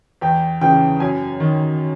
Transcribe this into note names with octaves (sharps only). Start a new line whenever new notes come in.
E2 G5
C#3 E3 G5
F#2 G#5
D#3